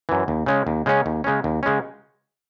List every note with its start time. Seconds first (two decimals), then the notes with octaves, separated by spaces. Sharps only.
0.09 F#2 E3
0.28 D#2
0.46 C#3 G#3 C#4
0.67 D#2
0.86 C#3 G#3 C#4
1.06 D#2
1.24 C#3 G#3 C#4
1.44 D#2
1.63 C#3 G#3 C#4